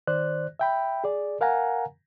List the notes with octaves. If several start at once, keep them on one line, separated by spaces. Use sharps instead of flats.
D#3 C5 D5 F#6
E5 G5 B5
G#4 D5
A#4 F5 F#5 G#5 A#5